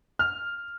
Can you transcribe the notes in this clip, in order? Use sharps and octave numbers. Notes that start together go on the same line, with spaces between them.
F6